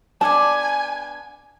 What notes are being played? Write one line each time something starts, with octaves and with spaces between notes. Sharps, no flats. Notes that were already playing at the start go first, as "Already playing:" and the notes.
B3 D4 G#5 A5